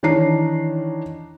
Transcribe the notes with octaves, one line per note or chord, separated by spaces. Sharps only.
D#3 E3 D4 C#5 A#5 C7